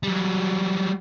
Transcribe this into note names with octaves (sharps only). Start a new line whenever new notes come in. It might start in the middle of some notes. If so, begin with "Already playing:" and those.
F#3 G3